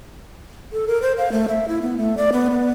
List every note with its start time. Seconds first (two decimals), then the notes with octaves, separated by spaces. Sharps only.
0.72 A4
0.87 A#4
1.02 C5
1.18 F5
1.32 A3
1.48 E5
1.68 E4
1.82 B3
1.97 A3
2.17 D5
2.33 B3
2.51 B3